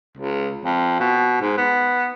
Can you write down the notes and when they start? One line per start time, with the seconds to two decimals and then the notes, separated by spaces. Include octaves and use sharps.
0.17 C#2
0.65 F2
1.00 B2
1.41 G#2
1.57 B3